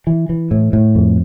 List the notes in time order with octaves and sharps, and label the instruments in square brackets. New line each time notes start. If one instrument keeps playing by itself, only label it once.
[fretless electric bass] E3
E3
A2
A2
F2